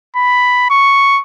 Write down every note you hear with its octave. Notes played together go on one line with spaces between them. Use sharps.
B5
C#6